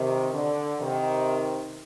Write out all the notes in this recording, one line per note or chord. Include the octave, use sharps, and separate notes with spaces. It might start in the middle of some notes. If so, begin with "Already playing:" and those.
Already playing: C3 D#3
D3
C3 D#3